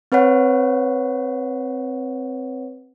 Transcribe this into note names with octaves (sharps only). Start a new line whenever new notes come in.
C4 B4 C#5 F#5